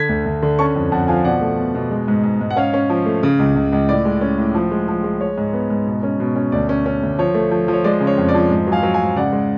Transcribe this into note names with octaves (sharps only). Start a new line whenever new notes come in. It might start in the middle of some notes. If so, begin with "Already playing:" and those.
Already playing: D3 G#6 B6
D2
D2
D3
C#4 A5 C#6
F2
F2 F#5 A5
F3 F5 G#5
B2 D5 F#5
A3
B2
B2
G#3
G#2
G#2
G#2
F#5
C#4 C#5 F5
C#4
F3
A3
C#3
C#2
C#2
C#2
A2 D5
G#3
C#4
A2
F3
G#3
F3
G#3
G#3 C#5
G#2
B3
G#2
B2
C#4
B2
C#4
D2 D5
C#4
C#4
D2
F3 C#5
A3
F3
F3
C#5
G#3 D5
C#3
C#5
F2
D5
F3
G#2
F#3
F5 G#5
F#3
F5 G#5
G#2
C#3 D5 F#5
G#3